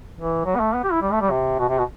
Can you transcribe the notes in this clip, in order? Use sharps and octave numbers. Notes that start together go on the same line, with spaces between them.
E3
F#3
B3
A3
B3
G4
E4
G3
A3
G3
C3
B2
C3
B2